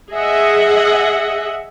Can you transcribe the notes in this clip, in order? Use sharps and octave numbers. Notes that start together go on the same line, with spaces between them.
G#4 D#5 E5 F#5